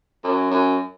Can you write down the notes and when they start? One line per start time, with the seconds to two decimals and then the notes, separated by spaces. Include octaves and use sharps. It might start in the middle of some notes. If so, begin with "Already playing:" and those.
0.24 F#2
0.51 F#2